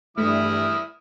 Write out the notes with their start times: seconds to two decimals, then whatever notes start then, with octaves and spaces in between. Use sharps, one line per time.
0.18 G2 E3 G3 A3 E4 D#6 F6